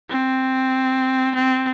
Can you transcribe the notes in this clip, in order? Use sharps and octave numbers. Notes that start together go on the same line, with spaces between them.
C4
C4